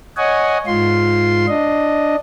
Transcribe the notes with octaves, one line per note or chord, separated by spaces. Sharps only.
C#5 D#5 F#5 G#5
G#2 F4 C6
D4 D#5